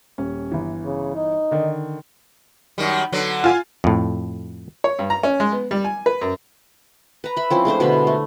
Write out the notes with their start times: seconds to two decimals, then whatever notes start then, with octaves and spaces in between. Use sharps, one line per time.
0.18 D#1 C#4
0.52 G1 E3
0.85 C#3
1.15 D#4
1.51 D3 D#3 D5
2.78 F#2 D#3 G3
3.12 D3 F#3 B3
3.44 F4 G#5
3.84 F2 A2
4.84 C#5
4.99 G2
5.10 A#5
5.23 C#4
5.40 G#3
5.52 B3
5.71 G3
5.84 G#5
6.06 B4
6.22 F#2
7.24 B4 A#5
7.36 E5 B5
7.50 F3 C4 C#4 E4
7.65 G#3 A3 D4 C5
7.80 B2 D3 G#3 B5
8.07 A3